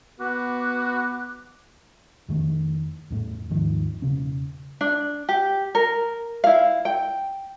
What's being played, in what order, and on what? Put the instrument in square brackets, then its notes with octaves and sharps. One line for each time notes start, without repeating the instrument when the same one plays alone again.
[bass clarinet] B3 [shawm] F#4 [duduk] B4 [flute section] D6 F#6
[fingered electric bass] F2 D#3 A3
E2 A2 A3
D#2 G#2 D#3 F3
E1 C#3 C#4
[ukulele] D4
G4
A#4
E4 F5
G5